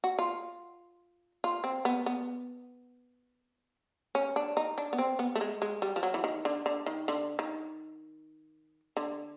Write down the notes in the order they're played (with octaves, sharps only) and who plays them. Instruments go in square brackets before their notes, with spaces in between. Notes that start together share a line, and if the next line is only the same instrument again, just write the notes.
[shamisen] F#4
F4
F4
C4
B3
B3
C#4
D4
D#4
D4
B3
C4
B3
A3
G#3
G#3
G3
F3
F#3
E3
D#3
D3
D3
D#3
D3
D#3
D3